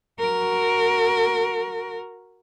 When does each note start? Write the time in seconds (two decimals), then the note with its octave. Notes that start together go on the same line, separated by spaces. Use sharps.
0.20 F#4 A#4